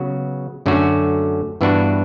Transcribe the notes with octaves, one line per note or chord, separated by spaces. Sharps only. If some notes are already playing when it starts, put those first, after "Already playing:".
Already playing: C#3 F#3 B3 F#4
F#2 D3 A3 C#4 F#4
G2 E3 B3 D4 F#4